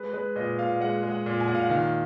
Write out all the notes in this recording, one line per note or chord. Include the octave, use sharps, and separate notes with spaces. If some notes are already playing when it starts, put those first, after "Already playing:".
Already playing: G#3 B4
G#3 B4
A#2 D#5
A#2 F5
G#3 F#5
G#3
F#5
A#2
G#5
A#2 F#5
F5
F#5
D#3 F5